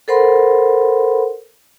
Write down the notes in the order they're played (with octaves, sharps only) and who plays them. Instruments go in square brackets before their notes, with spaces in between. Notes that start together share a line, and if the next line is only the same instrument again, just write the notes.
[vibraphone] A4 A#4 C5 F#5 B5 C6